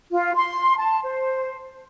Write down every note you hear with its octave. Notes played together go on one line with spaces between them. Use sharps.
F4
C6
A5
C5